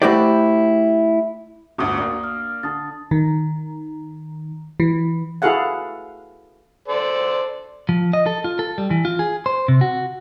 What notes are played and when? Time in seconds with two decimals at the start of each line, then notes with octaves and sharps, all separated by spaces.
0.02 A3 E4 F#4 G4 C5 D5
1.78 G1 D2 F#4 D6 D#6
1.98 A#3 D4 D#6
2.24 F6
2.63 D3 A5 D#6 A6
3.11 D#3
4.80 E3
5.42 E4 F#4 G#4 A4 F5 F#5
6.88 A4 C5 D5
7.89 F3
8.13 D#5
8.26 A4
8.44 F4
8.59 A4
8.78 G3
8.91 E3
9.05 F4
9.19 G#4
9.46 C5
9.68 C3
9.81 F#4